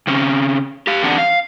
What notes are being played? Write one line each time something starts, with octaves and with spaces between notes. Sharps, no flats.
C#3 C4 C#4
G4 F5
E2 D3 C4 D4 F#5
F5